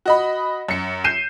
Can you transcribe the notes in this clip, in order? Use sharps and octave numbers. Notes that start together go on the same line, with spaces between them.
F#4 D#5 B5
F#2 C#7
G6 C7 D#7 E7